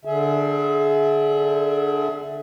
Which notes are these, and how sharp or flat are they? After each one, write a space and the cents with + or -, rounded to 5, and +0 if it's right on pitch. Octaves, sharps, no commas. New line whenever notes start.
D3 +0 G#4 +25 E5 -10